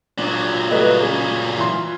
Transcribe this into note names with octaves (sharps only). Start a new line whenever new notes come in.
A#2 F#3 D4
G3 A3 B4 D#5
C#3 G#4
E3 F4 C6